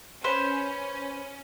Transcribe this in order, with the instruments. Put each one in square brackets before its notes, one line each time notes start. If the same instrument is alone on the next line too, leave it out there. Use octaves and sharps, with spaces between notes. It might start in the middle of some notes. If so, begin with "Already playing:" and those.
[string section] C#4 [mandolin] B4 C5